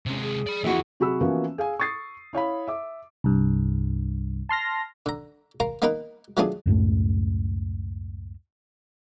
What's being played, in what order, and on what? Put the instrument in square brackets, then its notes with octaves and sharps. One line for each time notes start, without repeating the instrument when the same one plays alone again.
[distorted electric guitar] C3 G#3 [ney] C#4
[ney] G#4
[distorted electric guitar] D5 B5
[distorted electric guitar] F2 E3 [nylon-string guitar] E4 F#4 E5
[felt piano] C3 F#3 F#4 G#4 B5 E6
E3 F3 A#3 B3 C#4 F#4
G#4 F5 G#5
C#6 D#6 A6 C7
E4 C#5 F5 B5
E5 D6
[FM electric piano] C2 G2
A5 C6 F6 A#6
[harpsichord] D3 A#5
A#4 F5 A#5 C6
A#3 B3 D#4 A#4 B4
F#3 A3 B3 D4 F4 G#4
[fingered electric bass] C#2 F#2 A2 A3